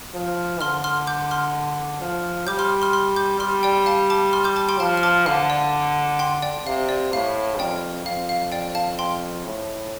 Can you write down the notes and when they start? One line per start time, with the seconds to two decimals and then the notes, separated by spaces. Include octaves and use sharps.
0.14 F3
0.61 D3 C6 F6
0.84 C6 F6
1.07 D6 G6
1.31 C6 F6
2.01 F3
2.47 G3 D6 G6
2.59 C6 F6
2.82 C6 F6
2.93 C6 F6
3.16 D6 G6
3.40 G3 C6 F6
3.63 D5 G5
3.86 F5 A5
4.10 A5 D6
4.33 C6 F6
4.44 D6 G6
4.56 A5 D6
4.69 G5 C6
4.80 F3 F5 A5
4.97 F6
5.03 A5 D6
5.26 D3 F5
5.50 D5
6.19 G5 C6
6.42 D5 G5
6.66 C3 F5
6.89 D5
7.12 A2 F5
7.59 F2 D5 G5
8.05 F2 F5
8.29 F5
8.52 D5 G5
8.75 F5 A5
8.99 G5 C6
9.45 A2